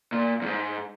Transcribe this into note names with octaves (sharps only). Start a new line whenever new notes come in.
A#2
E2 G#2